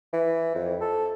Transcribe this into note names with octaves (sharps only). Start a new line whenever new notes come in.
E3
F2
A4